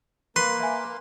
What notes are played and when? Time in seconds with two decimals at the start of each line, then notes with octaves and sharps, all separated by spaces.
0.36 A#3 B4 C6
0.60 E5 G#5